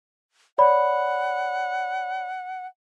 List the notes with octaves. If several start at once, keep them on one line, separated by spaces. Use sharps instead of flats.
C#5 D5 F#5 B5